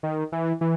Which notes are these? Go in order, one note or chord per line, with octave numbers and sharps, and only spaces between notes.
D#3
E3
E3